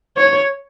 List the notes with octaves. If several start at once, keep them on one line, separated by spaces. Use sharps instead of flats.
C#5